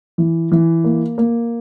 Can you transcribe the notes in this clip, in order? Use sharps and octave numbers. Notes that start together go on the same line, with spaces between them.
E3
E3
A#3
A#3